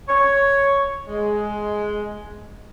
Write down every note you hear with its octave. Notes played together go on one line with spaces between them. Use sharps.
C#5
G#3